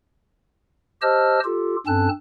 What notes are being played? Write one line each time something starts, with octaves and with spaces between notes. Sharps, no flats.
G4 C5 D#5 A5 E6 F6
F4 G4 A4
G2 C4 C#4 A4 A5 F#6